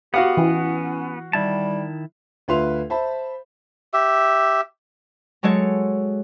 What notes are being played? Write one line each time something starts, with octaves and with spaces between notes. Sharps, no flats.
B3 F#4 G4 F5 F#5
E3 C#4
D#3 G3 E4 A5
D2 F4 B4 E5 C6 F7
C5 E5 A5 B5
G4 E5
F#3 G#3 A4 C#5